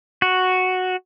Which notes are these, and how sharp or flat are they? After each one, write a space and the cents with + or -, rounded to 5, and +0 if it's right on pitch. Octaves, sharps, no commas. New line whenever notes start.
F#4 -5